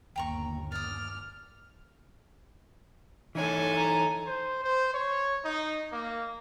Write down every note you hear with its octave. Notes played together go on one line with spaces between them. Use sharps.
G1 D#2 G5 A#5 C#6
D5 D#6 F6
E3 D#4 A4 C#5 G#5
A#5
C5
C5
C#5
D#4
A#3